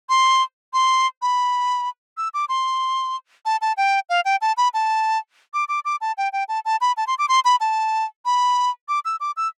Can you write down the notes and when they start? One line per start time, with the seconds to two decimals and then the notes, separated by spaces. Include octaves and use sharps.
0.09 C6
0.73 C6
1.22 B5
2.17 E6
2.34 D6
2.49 C6
3.46 A5
3.61 A5
3.77 G5
4.09 F5
4.25 G5
4.41 A5
4.57 B5
4.74 A5
5.54 D6
5.69 D6
5.85 D6
6.01 A5
6.18 G5
6.33 G5
6.49 A5
6.65 A5
6.81 B5
6.97 A5
7.07 C6
7.19 D6
7.29 C6
7.45 B5
7.60 A5
8.25 B5
8.89 D6
9.05 E6
9.20 D6
9.37 E6